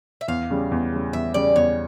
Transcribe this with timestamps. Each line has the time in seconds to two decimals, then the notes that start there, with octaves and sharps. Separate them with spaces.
0.21 E5
0.28 E2 F5
0.50 C#3 G3
0.71 E2
0.92 C#3 G3
1.13 E2 E5
1.34 C#3 G3 D5
1.55 E2 C#5